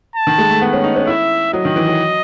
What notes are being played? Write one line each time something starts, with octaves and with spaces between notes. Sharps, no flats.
A5
D#3
G#3
A3
B3
C#4
D#4
C#4
E4 E5
F#3 D#5
D#3
E3
F#3